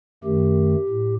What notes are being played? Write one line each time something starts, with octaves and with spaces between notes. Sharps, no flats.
F#2 D#3 A3 G4
A2